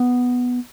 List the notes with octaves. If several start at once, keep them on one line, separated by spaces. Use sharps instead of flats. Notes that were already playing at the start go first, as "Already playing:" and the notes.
Already playing: B3